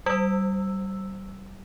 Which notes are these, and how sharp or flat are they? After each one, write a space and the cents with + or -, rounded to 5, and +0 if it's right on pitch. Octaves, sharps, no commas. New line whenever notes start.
G3 -25 E6 +0